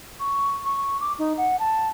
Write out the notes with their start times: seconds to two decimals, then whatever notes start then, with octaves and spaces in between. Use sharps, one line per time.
0.20 C#6
0.64 C#6
1.00 D6
1.18 D#4
1.38 F#5
1.59 A5